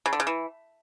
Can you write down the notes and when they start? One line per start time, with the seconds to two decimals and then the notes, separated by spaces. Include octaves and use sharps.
0.06 C#3
0.13 D3
0.20 C#3
0.27 E3